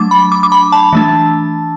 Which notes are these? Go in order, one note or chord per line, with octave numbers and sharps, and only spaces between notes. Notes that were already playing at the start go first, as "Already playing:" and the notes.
Already playing: F#3 A3 D4 D6
B5
D6
D6
B5
A5
E3 A3 D4